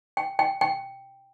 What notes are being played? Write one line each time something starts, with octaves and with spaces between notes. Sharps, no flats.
G5
G5
G5